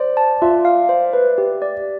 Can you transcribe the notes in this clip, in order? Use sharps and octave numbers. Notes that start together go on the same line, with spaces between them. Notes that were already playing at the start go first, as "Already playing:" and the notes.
Already playing: C5 D5
A5
F4 E5
F5
C5
B4
G4
D5